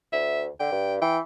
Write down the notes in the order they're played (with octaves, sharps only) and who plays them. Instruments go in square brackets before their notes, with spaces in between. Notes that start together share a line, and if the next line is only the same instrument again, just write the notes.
[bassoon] D2 [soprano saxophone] E5
[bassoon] D3 [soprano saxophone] G5
[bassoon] G2
[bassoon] E3 [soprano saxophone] G5